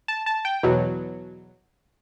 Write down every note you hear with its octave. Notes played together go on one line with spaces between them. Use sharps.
A5
A5
G5
E2 B2 F#3